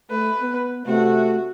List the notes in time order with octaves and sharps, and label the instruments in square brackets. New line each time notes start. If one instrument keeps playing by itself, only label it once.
[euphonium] A3 [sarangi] B4
[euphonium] B3
[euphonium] C3 [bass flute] A3 [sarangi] F#4